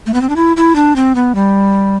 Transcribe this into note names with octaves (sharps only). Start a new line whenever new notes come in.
A3
B3
C4
D4
E4
E4
D4
C4
B3
G3